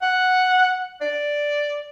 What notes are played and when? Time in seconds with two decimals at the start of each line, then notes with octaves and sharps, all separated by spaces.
0.02 F#5
1.01 D5